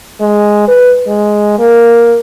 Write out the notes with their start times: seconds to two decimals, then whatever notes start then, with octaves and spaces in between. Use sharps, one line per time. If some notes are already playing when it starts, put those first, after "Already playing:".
0.21 G#3
0.68 B4
1.07 G#3
1.59 A#3